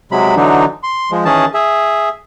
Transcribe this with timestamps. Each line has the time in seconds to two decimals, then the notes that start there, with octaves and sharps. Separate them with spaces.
0.12 C3 F#3 G#3 B5
0.37 D3 E3 F#3 D4 D#4
0.83 C6
1.11 F3 G#3
1.25 D#3 E3 C#4 G#4 A5
1.54 G#4 E5